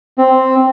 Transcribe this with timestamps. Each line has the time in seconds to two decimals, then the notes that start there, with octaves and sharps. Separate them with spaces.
0.18 C4